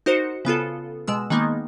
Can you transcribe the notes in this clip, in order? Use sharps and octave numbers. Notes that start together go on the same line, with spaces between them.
D#4 F#4 A#4 C5 C#7
C#3 B3 F4 A4
B2 G#3 E6
D#3 G#3 A#3 B3 D#4